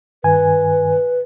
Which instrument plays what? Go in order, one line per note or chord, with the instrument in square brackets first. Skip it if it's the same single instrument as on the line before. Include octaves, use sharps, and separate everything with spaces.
[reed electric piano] G2 D#3 G#5 [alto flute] B4